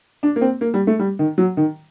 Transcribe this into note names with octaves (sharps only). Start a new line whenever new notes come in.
D4
A#3
C4
A#3
G3
A3
G3
D#3
F#3
D#3